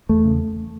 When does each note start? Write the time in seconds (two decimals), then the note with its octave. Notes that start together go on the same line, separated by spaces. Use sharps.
0.09 E2 A3
0.25 C#3